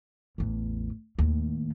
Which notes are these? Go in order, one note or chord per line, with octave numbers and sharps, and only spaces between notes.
A1 E2
D#2 A2